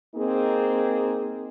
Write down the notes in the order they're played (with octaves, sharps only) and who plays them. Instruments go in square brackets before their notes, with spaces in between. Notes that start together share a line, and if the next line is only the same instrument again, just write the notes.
[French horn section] A#3 C4 D#4 G#4